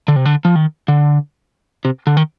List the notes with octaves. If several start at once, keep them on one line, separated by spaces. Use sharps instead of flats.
D3
C3
D3
F3
D#3
D3
C3
D3
D#3